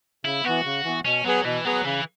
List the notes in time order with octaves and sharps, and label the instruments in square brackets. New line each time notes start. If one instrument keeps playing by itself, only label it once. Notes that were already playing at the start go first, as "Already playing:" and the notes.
[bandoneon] C#3 [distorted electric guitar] E4
[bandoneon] E3 B3 [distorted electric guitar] F#4
[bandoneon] C#3
E3 B3
[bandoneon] B2 [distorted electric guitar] C#4
[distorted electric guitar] F#3 [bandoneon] B3 G#4 B4
[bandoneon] B2 [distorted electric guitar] E3
[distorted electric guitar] F#3 [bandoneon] B3 G#4 B4
[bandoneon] C#3 [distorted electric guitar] E3